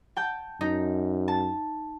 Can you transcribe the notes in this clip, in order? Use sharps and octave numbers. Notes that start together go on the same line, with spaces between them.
G5 A5 G6
F#2 D#4
A5